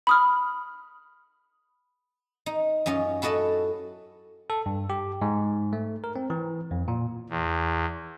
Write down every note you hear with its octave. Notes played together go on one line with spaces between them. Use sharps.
B5 D#6 F6
D#4
F#2 C#4 F4 D#5
E4 F#4 A4 D#5 A5
A4
G2
G4
G#2
A3
A#4
C4
E3
F2
A#2
E2